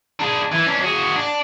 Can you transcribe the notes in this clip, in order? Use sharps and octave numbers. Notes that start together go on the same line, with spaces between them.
D4 G#4
E3
C#4 D4
F#4 G#4
D4